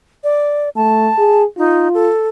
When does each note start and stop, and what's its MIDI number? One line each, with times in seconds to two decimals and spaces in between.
0.24 0.69 74
0.76 1.09 57
0.76 1.43 81
1.18 1.44 68
1.58 1.88 63
1.58 2.10 65
1.94 2.28 69